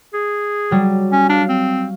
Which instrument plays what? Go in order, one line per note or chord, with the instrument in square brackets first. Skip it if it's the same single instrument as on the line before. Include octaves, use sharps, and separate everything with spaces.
[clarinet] G#4
[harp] F#3 G3
[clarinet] C#4
[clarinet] D4 [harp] F5
[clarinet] C4